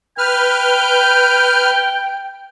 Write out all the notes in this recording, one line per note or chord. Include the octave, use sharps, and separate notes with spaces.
B4 G5 F6 G6